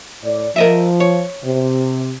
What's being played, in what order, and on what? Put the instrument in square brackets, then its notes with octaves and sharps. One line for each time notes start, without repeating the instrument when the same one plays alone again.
[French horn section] A2 D5
[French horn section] F3 [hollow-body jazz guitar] A#4 D#5 E5
[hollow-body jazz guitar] C#5
[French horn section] C3